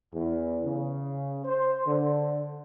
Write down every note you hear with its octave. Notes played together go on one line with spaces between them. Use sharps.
E2
C#3
C5
D3